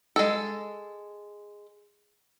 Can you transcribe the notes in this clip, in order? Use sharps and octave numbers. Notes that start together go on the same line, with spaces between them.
G#3 A4